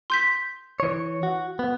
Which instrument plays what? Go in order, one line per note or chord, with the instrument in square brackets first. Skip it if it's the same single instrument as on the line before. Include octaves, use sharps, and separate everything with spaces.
[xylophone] C6 G6 B6
[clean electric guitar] E3 C#5
F#4
B3